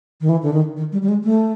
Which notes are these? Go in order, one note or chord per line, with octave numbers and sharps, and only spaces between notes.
D#3
E3
D3
D#3
D#3
G3
G3
G#3
A3